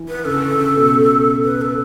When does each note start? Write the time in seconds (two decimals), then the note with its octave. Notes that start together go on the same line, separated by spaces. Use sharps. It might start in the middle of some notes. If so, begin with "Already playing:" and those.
Already playing: E3
0.09 B4
0.25 C#3 A4
0.52 C#3
0.76 B2
1.44 B4
1.61 A4